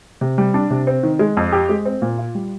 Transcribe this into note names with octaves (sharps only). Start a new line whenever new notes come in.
C3
G3
D4
C3
C4
D#3
G#3
F2
G4
G#3
C4
A#2
F4
G3